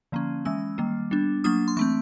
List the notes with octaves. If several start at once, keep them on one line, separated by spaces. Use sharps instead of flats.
D3 F3 A#3 C#4
E3 G#3 C#4 E6
D#3 G3 A#3
G3 B3 D4
F#3 A#3 D4 D#6
C6
E3 A3 C4 C#6